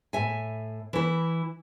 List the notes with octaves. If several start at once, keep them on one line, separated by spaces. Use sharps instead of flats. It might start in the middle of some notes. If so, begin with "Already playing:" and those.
A2 E5 G#5
E3 E4